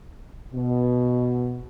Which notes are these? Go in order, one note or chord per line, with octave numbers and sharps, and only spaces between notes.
B2